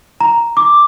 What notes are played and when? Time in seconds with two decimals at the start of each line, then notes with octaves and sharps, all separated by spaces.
0.21 A#5
0.57 D6